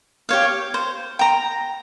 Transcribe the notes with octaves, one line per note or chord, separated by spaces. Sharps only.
G4 C#5 F5
C5
G5 A#5